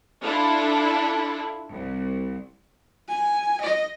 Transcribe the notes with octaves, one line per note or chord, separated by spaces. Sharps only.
D4 E4 F4 A4
C2
G#5
D#5